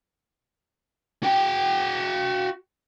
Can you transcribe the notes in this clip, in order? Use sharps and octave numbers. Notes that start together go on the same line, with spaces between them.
F#4 G5